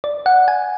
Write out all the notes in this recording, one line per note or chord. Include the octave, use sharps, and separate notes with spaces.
D5
F#5
G#5